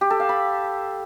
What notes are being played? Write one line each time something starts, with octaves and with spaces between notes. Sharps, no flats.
G4
A4
F5
B5